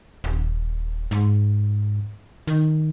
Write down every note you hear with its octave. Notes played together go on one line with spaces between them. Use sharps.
D#1
G#2
D#3